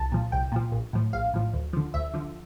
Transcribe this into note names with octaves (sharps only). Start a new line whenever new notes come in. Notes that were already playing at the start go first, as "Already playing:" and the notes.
Already playing: C2 A5
A#2 F3
C2 G5
A#2 F3
A#1
A2 F3
A#1 F5
A2 F3
D2
D3 F3
D2 E5
D3 F3